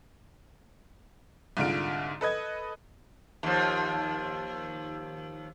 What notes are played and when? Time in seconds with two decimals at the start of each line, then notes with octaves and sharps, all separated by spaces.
1.57 C2 G#2 D3 F4 D7
2.21 A4 B4 D#5 G#6
3.43 D#2 F3